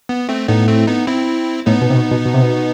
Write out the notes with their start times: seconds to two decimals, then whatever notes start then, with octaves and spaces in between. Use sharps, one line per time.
0.09 B3
0.29 A3 C4
0.48 A2 B3 D#4
0.68 A3 C4
0.87 B3 D#4
1.07 C4 E4
1.66 A2 B3 D#4
1.81 B2
1.90 C3
1.96 B2
2.11 B2
2.25 B2
2.34 C3
2.42 B2